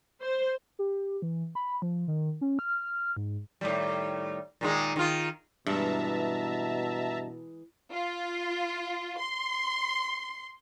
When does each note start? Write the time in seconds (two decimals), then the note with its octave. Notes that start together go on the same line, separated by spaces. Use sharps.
0.22 C5
0.79 G4
1.22 E3
1.55 B5
1.82 F3
2.08 D#3
2.41 C#4
2.59 F6
3.16 G#2
3.61 A2 D#3 G3
4.61 A#2 D#3 G#3
4.96 D#3 F4
5.67 G2 B2 E3 G#3 E5 A5 A#5
7.92 F4
9.19 C6